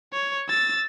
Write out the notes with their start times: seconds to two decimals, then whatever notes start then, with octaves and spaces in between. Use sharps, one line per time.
0.13 C#5
0.49 E6 A6